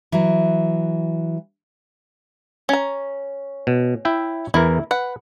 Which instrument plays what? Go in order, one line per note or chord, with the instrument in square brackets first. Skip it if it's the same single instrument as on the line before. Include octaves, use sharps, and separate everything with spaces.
[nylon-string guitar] E3 F#3
[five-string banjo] C#4 A#5
[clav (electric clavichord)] B2
E4 E5 G5
[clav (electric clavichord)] E2 E3 A#4 [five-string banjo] E4
[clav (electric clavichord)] B4 [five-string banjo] F#5